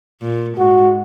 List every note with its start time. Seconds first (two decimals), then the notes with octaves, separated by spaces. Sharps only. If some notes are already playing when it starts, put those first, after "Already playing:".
0.21 A#2
0.58 G#2 F#4